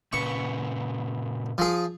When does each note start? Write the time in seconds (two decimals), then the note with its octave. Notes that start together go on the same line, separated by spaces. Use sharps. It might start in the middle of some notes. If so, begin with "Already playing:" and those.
0.13 A#2 C#3 B4 C#6
1.58 F3 G#4